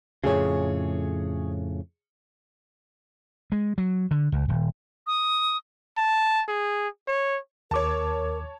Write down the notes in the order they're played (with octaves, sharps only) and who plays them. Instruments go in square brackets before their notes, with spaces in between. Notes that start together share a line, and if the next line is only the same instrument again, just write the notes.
[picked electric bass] F2 A2 C#3 [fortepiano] G#4 C#5
[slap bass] G#3
F#3
D3
C#2
D#1
[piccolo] D#6
[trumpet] A5
G#4
C#5
[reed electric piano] D#2 D6 [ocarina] A#4 [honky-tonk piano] C#5 A5